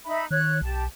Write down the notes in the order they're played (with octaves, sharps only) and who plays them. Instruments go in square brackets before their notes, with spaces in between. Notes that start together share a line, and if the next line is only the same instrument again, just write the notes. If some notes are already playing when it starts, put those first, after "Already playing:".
[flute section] D#4 E5 B5
[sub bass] D#3 [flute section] C#5 F#6
[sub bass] B1 [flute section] G4 A5